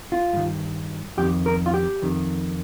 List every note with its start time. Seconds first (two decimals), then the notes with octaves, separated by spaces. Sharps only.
0.12 F4
0.33 G2 D#3
1.17 F2 G4
1.22 D#3
1.46 A#4
1.66 F4
1.74 G4
2.02 F2 D#3